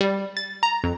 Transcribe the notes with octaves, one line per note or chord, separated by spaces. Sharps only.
G3
A6
A#5
F2